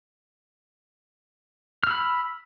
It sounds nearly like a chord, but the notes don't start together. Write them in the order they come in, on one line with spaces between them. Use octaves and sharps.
F6 E6 B5